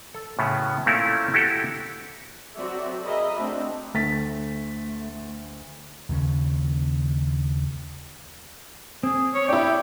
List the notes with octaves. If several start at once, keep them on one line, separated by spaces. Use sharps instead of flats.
A4
A2 C#3 F#3 B3
A#2 A3 C4 C#4 E4 A#4
E4 F#4 G4 A4
F#3 C4 F#4 A4 D5 E5
G#4 A#4 D#5 E5 B5
A3 C4 D4 F#4
D2 A3 A6 B6
D#2 C#3 C#4
C4 G#4
C#5
D4 E4 G4